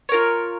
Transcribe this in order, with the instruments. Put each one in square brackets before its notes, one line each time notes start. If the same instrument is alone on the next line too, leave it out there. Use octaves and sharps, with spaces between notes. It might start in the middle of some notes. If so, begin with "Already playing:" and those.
[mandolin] F4 A#4 C#5